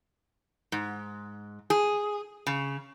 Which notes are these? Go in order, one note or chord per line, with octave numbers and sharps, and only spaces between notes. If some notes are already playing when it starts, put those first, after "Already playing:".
G#2
G#4
C#3